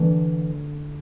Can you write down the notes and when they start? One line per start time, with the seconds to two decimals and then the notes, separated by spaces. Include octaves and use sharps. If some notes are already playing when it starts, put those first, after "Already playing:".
Already playing: D3 E3 A3 D4